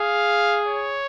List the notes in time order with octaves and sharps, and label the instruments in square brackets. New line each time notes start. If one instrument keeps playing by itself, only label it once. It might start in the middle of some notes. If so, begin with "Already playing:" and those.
Already playing: [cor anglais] G#4 [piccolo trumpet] F5
[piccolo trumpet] C#5